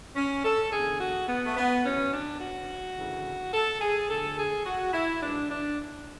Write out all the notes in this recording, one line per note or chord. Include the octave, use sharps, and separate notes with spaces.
C#4
A4
E2 D3 G#4
F#4
B3
A3
B3
E2 B2 C#4
D4
F#4
D2 C#3 E3
A4
G#4
D2 D3 A4
G#4
F#4
E4
G#2 E3 D4
D4